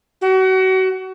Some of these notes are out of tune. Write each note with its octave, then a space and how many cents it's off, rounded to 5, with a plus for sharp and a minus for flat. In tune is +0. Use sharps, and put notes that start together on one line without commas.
F#4 +30